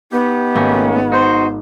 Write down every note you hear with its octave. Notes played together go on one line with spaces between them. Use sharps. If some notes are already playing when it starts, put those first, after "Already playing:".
B3 D#4 G4
G#1 A3 A#3 C#4
D#4 F#4 C5